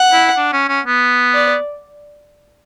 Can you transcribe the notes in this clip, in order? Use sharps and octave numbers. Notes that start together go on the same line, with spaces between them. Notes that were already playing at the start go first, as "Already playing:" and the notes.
Already playing: F#5
E4
D4
C#4
C#4
B3
D5